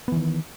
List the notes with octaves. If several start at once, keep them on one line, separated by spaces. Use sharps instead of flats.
D#3 E3 B3